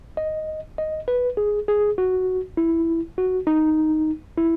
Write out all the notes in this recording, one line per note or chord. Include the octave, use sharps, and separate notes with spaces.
D#5
D#5
B4
G#4
G#4
F#4
E4
F#4
D#4
E4